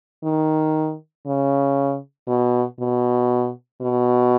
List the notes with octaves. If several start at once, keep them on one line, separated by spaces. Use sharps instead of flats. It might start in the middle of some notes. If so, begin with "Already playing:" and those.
D#3
C#3
B2
B2
B2